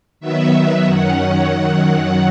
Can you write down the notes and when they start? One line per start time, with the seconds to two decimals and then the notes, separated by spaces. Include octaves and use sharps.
0.20 D#3 F#3 B3 E5
0.85 F#2 D#3 F#3 C#4 F#5
1.51 F#2 D#3 F#3